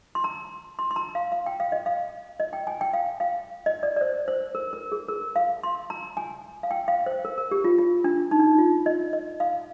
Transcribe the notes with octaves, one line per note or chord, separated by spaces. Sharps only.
C6
A#5
C6
C6
A#5
F5
F5
G5
F5
D#5
F5
D#5
G5
G#5
G5
F5
F5
D#5
D5
D5
C5
C5
A#4
A#4
G#4
A#4
F5
C6
A#5
G#5
F5
G5
F5
C5
A#4
A#4
G4
F4
F4
D4
D#4
D4
D#4
F4
D#5
D#5
F5